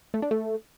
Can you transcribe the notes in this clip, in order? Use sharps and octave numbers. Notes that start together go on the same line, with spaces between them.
A3
D4
A3